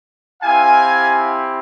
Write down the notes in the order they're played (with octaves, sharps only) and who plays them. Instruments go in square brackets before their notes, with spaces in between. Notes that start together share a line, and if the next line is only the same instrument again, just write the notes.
[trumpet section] C4 E4 G4 F5 G#5